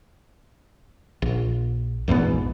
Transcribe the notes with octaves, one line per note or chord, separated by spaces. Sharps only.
A#1
A#1 E2 G#2 B3